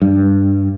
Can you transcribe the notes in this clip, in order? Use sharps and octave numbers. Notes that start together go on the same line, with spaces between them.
G2